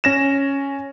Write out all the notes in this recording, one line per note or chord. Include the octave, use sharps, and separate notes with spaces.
C#4 A#6 E7